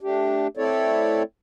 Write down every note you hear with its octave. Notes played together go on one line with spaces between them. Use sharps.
A3 D4 G4
A3 C4 E4 A4 C#5 D5